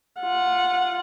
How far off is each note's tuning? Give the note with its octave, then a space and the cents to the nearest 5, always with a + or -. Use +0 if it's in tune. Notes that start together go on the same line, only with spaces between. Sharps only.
F4 +0 F#5 -20